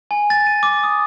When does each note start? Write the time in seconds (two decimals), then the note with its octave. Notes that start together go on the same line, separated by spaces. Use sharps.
0.11 G#5
0.30 A6
0.47 D#7
0.63 D6
0.84 D#6